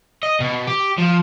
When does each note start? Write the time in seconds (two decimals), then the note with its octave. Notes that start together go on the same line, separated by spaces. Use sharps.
0.23 D#5
0.40 B2
0.67 G4
0.98 F3